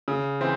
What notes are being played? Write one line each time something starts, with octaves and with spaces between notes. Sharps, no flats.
C#3
E3 C4